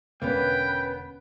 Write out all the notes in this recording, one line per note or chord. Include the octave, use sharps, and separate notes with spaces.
E1 D3 A#3 B3 C#4 B4 G5